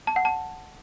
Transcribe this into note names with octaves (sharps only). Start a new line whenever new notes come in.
A5
F#5
A5